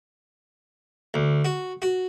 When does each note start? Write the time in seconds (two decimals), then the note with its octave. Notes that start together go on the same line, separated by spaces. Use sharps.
1.14 D2
1.45 F#4
1.82 F#4